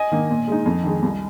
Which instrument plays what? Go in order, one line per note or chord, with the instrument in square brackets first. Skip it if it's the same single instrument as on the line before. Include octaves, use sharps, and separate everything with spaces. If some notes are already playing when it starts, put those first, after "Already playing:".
Already playing: [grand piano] D#5 G#5
[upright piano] D#3 A#3
A#2
G#3 D#4
F2
D#3 G#3
C2